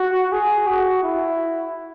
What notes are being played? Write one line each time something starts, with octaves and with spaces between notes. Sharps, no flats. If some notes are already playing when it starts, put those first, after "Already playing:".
Already playing: F#4
G#4
F#4
E4